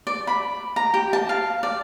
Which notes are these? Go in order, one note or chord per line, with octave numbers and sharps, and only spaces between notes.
D5
B5
A#5
G4
A5
F5
D5